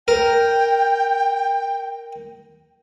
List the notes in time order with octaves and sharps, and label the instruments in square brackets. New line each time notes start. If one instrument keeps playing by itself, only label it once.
[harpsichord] A#4 [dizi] G5